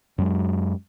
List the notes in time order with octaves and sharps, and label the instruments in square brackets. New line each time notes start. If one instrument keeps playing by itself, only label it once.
[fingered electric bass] F#2 F#3 G#3